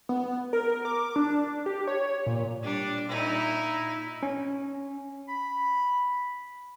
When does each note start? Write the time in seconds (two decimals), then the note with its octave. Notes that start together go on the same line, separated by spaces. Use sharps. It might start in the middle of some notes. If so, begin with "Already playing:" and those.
0.09 B3
0.53 A#4
0.85 D6
1.16 D4
1.66 G4
1.87 C#5
2.26 A#2
2.63 G3 D4
3.09 A#2 D#4 E4
4.23 C#4
5.29 B5